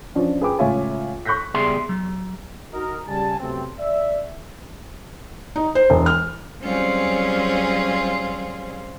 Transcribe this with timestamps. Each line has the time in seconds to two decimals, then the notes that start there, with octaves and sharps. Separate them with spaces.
0.15 F3 C#4 D4
0.41 G#4 B4 G5 D6
0.59 C#2 A2 F4 C#5 E5 G#5
1.25 C#6 F#6 G6 A#6 B6
1.54 C#2 G3 B3 G#4 E5 C6
1.89 F#3
2.73 D#4 F#4 A#4 D#5
3.07 C#3 G3 G#5 A5
3.39 C3 F#3 A3 B3 C4
3.79 D5 E5
5.56 D#4
5.75 C5
5.90 E1
6.06 F6
6.62 F#3 G3 C4 C#4 F4 G#4